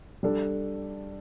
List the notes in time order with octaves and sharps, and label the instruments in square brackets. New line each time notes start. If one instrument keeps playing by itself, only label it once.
[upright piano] G3 D4 A4